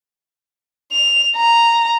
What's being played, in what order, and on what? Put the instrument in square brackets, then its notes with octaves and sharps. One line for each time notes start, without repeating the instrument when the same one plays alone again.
[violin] F7
A#5